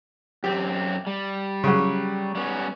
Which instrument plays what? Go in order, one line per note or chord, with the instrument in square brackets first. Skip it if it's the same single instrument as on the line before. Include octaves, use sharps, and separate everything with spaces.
[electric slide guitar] F#2 C4 [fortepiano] G4
[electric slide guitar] G3
[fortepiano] C#3 F#3
[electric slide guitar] G3 B3 C#4